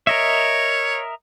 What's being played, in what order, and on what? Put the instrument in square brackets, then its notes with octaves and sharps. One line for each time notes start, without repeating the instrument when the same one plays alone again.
[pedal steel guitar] A#4 D#5 E5 [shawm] C#5